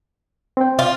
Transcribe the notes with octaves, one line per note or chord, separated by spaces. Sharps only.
C4 G5
F4